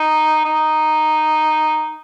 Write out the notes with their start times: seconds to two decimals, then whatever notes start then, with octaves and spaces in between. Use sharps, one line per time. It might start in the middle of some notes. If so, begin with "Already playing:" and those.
Already playing: D#4
0.45 D#4